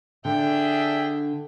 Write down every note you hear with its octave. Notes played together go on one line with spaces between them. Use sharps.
D3 D4 G#4 E5 G5